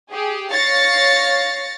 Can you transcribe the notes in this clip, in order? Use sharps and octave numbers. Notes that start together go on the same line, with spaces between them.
G4 G#4
C#5 F5 A6 A#6 C7 C#7